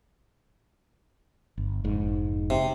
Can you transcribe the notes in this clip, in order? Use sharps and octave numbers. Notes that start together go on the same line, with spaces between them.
G1
F1 G#2
C3